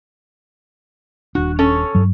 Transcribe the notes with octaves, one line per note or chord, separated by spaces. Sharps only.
D#1 D4 F#4
C#4 A4 C#5
G2 F#3